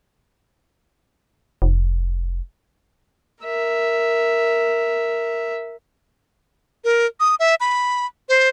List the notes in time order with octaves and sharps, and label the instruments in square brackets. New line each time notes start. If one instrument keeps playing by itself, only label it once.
[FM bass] F1
[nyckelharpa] A#4 E5
[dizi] A#4
D#6
E5
B5
C5